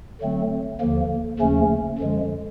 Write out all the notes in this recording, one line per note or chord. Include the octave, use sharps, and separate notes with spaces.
D3 F#3 A3 C4
D#2 D3 F3 A#3
D#2 C#3 F3 A3 C#4
F#2 D3 F3 G#3